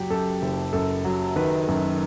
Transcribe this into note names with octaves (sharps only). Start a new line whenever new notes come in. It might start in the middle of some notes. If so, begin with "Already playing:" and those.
Already playing: F#1 F#3 G4
F#2 A4
F#1
F#2 A4
F#3
D#3 B4
F#2